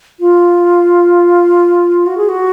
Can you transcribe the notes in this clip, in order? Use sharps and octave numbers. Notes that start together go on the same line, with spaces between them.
F4
F#4
G#4
F#4